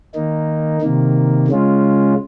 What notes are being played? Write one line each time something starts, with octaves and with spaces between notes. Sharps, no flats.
D#3 A#3 D#4
C3 D#3 A#3
C#3 G#3 C#4 F4